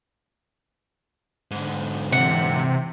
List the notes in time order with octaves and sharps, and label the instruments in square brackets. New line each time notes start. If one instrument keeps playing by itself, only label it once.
[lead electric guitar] G#2 D3
[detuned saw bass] C3 [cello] E3 [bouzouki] F#5